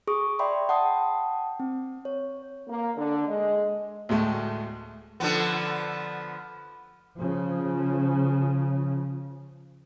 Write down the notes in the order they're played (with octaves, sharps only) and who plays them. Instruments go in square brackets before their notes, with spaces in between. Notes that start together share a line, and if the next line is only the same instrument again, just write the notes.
[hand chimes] G#4 C#6 D#6
D5 E5 G5 B5 C6
F#5 G5 A5 D#6
C4
C#5
[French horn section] A#3
D3
G#3
[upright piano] D2 A2 G#3 A3
[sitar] D3 F3 B3
[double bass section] C#3 F3